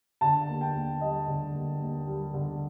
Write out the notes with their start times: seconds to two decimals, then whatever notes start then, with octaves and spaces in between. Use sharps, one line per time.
0.21 D3 A5
0.48 D#2
0.61 G5
0.75 D#2
1.01 G3 D#5
1.28 D3
1.54 D#2
1.80 D#2
2.07 G3
2.34 D3